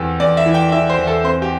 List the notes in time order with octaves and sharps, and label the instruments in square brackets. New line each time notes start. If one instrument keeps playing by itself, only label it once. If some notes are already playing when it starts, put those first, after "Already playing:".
Already playing: [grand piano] E2 E3 C4 G4 A4
E2 D5
E5
E3
G5
E3 E5
C5
E2
A4
C4 C5
G4